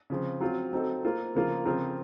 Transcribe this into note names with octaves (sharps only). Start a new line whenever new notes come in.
C#3 F3 C4
F#3 C4 F4
F#3 C4 D#4 A4
A#3 F4 C5
C#3 F3 A#3 F4
C#3 F3 C4 F4 A#4